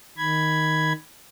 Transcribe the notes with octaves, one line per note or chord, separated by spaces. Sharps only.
D#3 B5 G#6